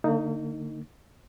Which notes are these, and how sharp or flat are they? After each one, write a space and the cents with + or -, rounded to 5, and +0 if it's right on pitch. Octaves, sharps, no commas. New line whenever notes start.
D3 +0 A#3 -45 D#4 +0